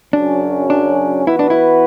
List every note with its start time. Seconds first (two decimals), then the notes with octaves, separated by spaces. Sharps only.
0.13 F#2 C#3 F#3 C#4 D4
0.70 D4
1.27 E3 B3 E4 F#4 B4
1.39 D4
1.50 E4